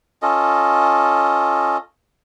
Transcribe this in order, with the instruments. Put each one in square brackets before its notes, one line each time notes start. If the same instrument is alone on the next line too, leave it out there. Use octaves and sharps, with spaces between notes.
[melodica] C#4 F4 A4 D#5